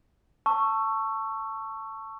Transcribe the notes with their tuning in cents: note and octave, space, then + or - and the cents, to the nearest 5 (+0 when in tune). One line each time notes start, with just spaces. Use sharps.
A5 +15 C#6 +0 E6 +20